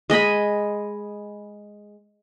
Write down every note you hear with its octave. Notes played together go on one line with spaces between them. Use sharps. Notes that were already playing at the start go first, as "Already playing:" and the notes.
G#3 D#5 G#5 B5